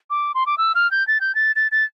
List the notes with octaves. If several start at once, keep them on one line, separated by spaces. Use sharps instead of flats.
D6
C6
D6
E6
F6
G6
A6
G6
A6
A6
A6